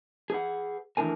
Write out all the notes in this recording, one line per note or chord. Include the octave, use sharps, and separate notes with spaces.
G#4 B4 F#5
D#3 E3 A3 D4 A#4 G#5